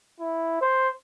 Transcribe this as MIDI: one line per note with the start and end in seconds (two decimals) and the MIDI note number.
0.20 0.58 64
0.62 0.89 72